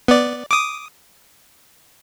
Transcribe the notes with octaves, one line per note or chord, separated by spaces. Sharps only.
B3 D5
D6 D#6